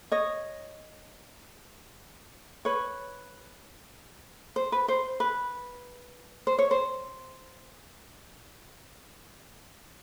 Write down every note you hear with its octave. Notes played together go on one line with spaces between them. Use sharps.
C#5 D#5
B4 C#5
C5
B4
C5
B4
C5
C#5
C5